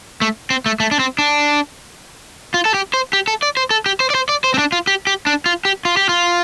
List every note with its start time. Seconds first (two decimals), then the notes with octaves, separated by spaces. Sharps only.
0.21 A3
0.50 C4
0.66 A3
0.80 A3
0.91 D4
0.99 C4
1.19 D4
2.54 F4
2.65 A4
2.74 G4
2.94 C5
3.13 G4
3.28 A4
3.43 D5
3.57 C5
3.70 A4
3.86 G4
4.00 C5
4.10 D5
4.15 C5
4.29 D5
4.44 C5
4.54 C4
4.58 D4
4.72 F4
4.87 G4
5.07 G4
5.27 D4
5.46 F4
5.65 G4
5.85 F4
5.97 G4
6.09 F4